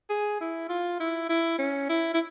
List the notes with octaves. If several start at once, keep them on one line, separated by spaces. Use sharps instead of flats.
G#4
E4
F4
E4
E4
C#4
E4
E4